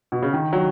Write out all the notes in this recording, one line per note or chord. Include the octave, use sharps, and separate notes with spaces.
B2
C#3
D#3
F#3